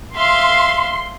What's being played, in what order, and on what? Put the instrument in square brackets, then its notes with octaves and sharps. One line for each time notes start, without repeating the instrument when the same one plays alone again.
[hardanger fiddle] E5 F5 [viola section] C6